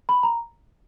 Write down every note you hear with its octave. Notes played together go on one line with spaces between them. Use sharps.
B5
A#5